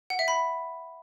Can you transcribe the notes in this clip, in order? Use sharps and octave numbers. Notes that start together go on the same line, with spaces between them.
F#5
E5
B5